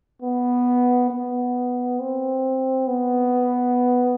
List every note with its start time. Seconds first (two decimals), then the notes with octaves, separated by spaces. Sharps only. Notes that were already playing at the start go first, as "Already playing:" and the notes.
0.22 B3
1.10 B3
2.00 C4
2.87 B3